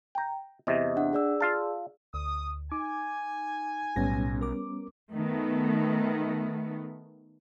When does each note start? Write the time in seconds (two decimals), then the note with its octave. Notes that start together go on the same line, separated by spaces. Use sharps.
0.15 G5 A#5
0.67 E2 C3 D#5 E5
0.97 D4 F#5
1.13 G#4 D5 E6
1.41 F4 F5 A5
2.14 D2 D#6
2.72 D#4 G#5 D6
3.96 B1 A2 G3 B3 C#4 A#6
4.41 A#4 D6
5.12 D#3 A3 B3